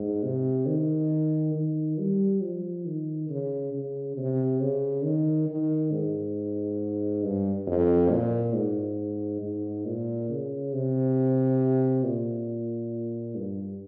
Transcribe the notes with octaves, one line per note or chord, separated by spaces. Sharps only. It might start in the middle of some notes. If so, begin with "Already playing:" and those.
Already playing: G#2
C3
D#3
D#3
G3
F3
D#3
C#3
C#3
C3
C#3
D#3
D#3
G#2
G2
F2
A#2
G#2
G#2
A#2
C#3
C3
A#2
G2